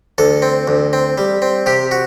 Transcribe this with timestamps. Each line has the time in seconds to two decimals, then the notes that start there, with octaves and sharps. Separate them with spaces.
0.18 D2 A4
0.42 C4
0.68 D2
0.93 C4
1.18 G3
1.42 C4
1.66 C3 G4
1.91 F#4